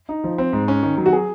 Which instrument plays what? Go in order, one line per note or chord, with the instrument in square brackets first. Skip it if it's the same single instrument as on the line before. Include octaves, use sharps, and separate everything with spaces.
[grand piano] D#4
F3
C4
G#2
C#4
D#3
F#3
[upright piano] F#4
G#4